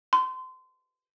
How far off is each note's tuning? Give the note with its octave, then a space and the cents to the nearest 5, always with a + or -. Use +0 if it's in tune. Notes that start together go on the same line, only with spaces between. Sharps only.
C6 -25